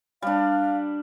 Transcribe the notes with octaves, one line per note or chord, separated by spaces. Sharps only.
G3 D4 F5